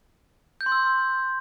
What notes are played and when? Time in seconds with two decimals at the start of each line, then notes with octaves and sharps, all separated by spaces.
0.61 G6
0.66 C6
0.72 E6